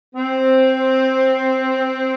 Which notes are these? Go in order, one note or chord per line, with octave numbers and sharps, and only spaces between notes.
C4